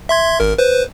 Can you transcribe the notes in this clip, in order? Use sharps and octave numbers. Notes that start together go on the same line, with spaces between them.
E5 C6 G#6
G#1 A#4
B4 C5